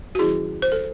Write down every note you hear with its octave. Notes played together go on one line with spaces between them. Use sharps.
F#4
D#3 F#3 C#4 E4 G#4
C5
A4